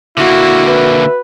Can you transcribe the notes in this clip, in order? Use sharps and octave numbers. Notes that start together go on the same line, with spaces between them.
D3 A#3 E4 F#4
B4 E5